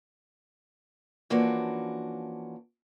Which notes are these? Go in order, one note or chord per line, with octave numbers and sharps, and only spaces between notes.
E3 F3 A#3 C#4 D4 F#4